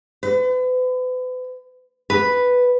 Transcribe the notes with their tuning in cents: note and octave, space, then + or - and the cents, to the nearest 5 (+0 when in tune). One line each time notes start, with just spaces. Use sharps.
B4 +40
B4 +0